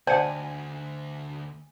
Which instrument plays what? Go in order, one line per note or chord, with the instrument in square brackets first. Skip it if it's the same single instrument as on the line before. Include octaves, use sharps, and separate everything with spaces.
[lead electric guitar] D2 [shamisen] D4 [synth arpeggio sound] C5 F#5 [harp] G#5